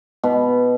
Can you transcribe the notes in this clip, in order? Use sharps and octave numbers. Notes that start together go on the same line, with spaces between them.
B2